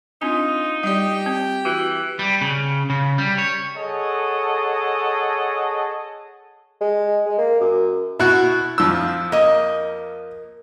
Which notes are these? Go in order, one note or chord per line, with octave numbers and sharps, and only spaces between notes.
C4 D4 D#4 F4 G#5
G3 G4 D5 G5
C4
E3 F#4
G3
C#3
C#3
G3
C#5
G#4 A4 C#5 D#5 F#5 A5
G#3
G#3
A#3
F#2
B2 E4 F#4
F2 F3 E6
A#3 D#5